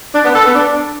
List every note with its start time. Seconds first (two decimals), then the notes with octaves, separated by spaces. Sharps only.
0.14 D4
0.24 B3
0.34 A4
0.44 B3
0.54 D4